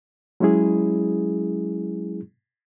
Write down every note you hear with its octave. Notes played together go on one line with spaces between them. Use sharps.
F#3 G#3 C#4 E4 G#4